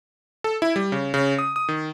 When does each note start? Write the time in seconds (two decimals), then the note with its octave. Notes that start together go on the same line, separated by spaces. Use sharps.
0.44 A4
0.62 E4
0.76 G3
0.92 C#3
1.14 C#3
1.39 D#6
1.56 D#6
1.68 D#3